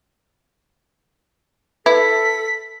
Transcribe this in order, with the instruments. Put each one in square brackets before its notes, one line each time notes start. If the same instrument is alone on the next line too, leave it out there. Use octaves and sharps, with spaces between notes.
[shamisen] E4 [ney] A4 [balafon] B4 [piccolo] B6